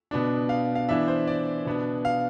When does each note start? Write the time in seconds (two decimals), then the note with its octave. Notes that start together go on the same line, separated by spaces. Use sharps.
0.11 B2 B3 D4
0.49 F5
0.75 F5
0.89 E3 B3 D4 E5
1.08 C5
1.27 D5
1.66 B2 B3 D4
2.05 F5